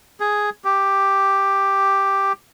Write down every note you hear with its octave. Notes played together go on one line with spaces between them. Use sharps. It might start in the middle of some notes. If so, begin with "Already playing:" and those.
G#4
G4